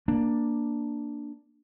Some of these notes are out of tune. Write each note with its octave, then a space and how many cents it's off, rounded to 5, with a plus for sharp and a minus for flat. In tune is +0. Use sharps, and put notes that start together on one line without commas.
A#3 +0 D4 +0